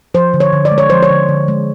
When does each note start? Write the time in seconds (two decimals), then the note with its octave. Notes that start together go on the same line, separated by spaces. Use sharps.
0.14 F3 C5
0.34 D3
0.40 C#5
0.53 D3
0.65 D5
0.72 G#3
0.78 C#5
0.90 F3 C5
1.03 C#5
1.10 D3
1.29 D3
1.48 G#3